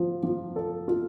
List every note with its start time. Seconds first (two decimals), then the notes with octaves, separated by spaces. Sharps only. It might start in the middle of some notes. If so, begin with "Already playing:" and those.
Already playing: F3
0.23 F3
0.56 A4
0.88 F4